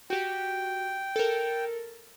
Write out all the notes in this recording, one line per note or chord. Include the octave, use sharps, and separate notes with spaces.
F#4 G4 G5
A4 A#4